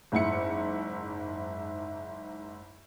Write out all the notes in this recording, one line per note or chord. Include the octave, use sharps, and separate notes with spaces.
F#1 G#2 E4 C#7